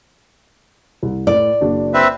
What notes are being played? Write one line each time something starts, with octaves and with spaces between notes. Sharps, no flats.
C2
A2 D5
F#1 D4 F#4
C4 B4 E5